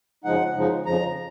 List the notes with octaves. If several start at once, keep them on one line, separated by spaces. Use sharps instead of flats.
F#2 C#3 F3 G#3 D#4 F#5
F#2 C#3 F3 G#3 D#4
F2 C#3 F3 A#5